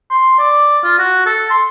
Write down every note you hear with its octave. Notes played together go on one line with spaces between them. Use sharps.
C6
D5
F4
F#4
A4
C6